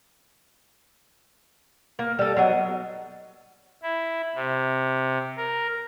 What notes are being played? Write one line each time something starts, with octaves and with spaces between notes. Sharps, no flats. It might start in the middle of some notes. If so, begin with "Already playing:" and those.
A#3
G3 A4
F#3 A3 B3 D#4
E4
C3
A#4